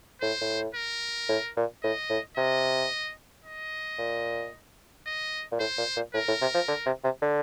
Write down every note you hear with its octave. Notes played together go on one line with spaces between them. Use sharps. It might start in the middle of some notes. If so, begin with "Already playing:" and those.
A2 C5
A2
A#4
A2
A#2
A2 D#5
A2
C3 D#5
D#5
A#2
D#5
A#2
A2 C5
A#2
A#2
A2 A#4
A2
C3
F3
D3
C3
C3
D3